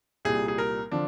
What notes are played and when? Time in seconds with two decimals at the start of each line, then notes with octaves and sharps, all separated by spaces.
0.25 C2 A#2 G3 G#4
0.48 G#4
0.58 A#4
0.91 D3 F3 D4